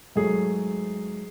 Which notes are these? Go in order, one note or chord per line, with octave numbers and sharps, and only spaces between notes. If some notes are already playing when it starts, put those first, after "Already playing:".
G#2 F#3 A3 G#4